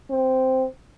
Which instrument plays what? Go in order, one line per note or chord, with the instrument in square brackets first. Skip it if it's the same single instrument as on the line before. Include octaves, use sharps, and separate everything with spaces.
[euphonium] C4